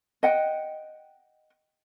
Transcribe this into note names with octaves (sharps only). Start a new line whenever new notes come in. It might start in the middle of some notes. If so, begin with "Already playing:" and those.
D#5 F#5 G5